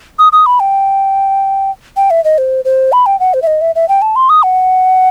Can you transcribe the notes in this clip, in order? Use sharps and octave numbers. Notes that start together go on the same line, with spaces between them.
D#6
D#6
B5
G5
G5
E5
D#5
C5
C5
B5
G5
F#5
C5
E5
D#5
E5
E5
G5
A5
C6
D#6
F#5